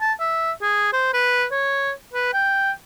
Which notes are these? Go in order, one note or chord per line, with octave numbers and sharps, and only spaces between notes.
A5
E5
G#4
C5
B4
C#5
B4
G5